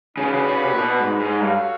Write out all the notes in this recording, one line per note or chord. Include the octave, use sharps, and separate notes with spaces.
C#3 D4 F#4 B4
C#3
C#3
C3
A#2
B2
G#2
G#2
G2 F#4 A4 C#5 F5